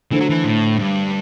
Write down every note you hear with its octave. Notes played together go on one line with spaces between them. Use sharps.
D3 E3 A3 D4 A4 C5
F#3
E3
A2
G2